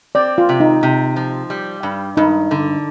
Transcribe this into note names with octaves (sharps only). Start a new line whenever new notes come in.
C4 D5
F4
C3
D#4
C3
F3
G3
G2
G2 D#4
D3